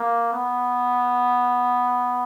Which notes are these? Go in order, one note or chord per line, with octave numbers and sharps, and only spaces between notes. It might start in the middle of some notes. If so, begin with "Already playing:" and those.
Already playing: A#3
B3